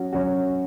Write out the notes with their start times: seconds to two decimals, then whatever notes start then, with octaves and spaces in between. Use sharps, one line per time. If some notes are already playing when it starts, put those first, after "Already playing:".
Already playing: F#3 C#4 F#4
0.13 F#3 C#4 F#4